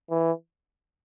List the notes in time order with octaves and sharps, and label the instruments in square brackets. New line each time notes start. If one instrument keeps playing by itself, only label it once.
[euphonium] E3